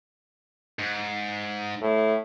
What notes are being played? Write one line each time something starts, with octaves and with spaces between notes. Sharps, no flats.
G#2
A2